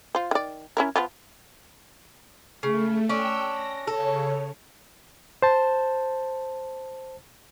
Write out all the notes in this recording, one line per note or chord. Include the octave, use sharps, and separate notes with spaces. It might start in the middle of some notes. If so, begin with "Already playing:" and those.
F4 C5
D#3 D5
C#4 E4 A#4
F3 B3 F4
C#3 A3
C#4 D4 G5 E6
A#6
C#3 A4 C#5
C5 A5